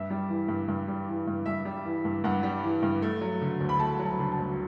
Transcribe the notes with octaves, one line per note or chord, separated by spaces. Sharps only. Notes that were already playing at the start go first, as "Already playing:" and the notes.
Already playing: G2 E5
G3
E3
G2
G2
G3
E3
G2
G2 E5
G3
E3
G2
G2 F#5
G3
E3
G2
A3
F#3
D3
D2
B5
A3 A5
F#3
A5
D3
A5
D2